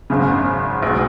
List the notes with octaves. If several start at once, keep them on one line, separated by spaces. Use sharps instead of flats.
G#1 F#2 C#3
B1 B2 G#3